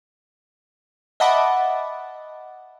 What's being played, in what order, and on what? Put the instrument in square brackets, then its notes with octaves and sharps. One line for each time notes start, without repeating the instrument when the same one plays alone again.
[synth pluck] D#5 E5 F#5 A5 B5 D6